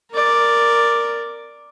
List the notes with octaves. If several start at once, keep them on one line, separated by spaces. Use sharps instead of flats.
A#4 D5